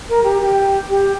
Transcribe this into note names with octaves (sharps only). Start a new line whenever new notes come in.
A#4
G4
G4
G4